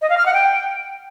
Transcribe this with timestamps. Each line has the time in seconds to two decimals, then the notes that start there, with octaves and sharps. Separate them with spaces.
0.02 D#5
0.10 F5
0.18 F6
0.26 F#5
0.34 G5